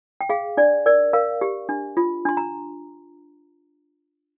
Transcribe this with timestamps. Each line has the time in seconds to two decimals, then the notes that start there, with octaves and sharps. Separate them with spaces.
0.21 G5
0.29 G#4 F5
0.57 D4 D5
0.86 A#4 D5
1.13 A#4 F5
1.41 G4
1.69 D4
1.97 F4
2.25 D4 C6
2.37 A#5